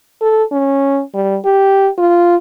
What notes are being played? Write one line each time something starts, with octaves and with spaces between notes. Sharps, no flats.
A4
C#4
G3
G4
F4